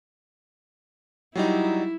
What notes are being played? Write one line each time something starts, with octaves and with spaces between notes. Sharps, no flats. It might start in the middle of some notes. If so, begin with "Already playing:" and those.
F#3 G3 D#4 E4